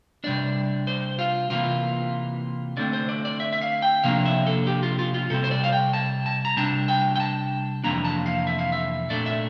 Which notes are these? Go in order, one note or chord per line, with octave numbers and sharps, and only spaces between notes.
C3 G3 D4 D5
C5
F4
C3 E3 A#3 F4
D3 A3 C4 D5
C5
D5
D5
E5
E5
F5
G5
C3 F3 A#3 D4 F5
E5
A4
G4
F4
F4
F4
C3 G3 C4 A4
C5
D5
F5
G5
A5
A5
A#5
C3 G3 D4 A5
G5
G5
A5
F2 C3 E3 A#3 D4 A#5
A5
F5
E5
F5
E5
A#2 A3 D4 D5
E5